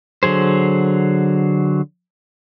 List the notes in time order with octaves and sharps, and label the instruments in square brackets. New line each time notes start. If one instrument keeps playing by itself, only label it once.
[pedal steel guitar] D3 F#3 G#4 C5